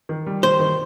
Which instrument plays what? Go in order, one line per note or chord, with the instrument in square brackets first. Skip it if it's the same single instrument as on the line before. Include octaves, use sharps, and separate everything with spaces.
[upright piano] D#3
G3
[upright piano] D#3 [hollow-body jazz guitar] C5
[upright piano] D#3